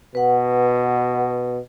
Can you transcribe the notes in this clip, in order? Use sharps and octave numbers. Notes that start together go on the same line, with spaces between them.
B2 B4 F#5